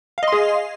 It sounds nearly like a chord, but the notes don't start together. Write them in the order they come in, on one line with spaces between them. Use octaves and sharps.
F5 D#5 C6 G#4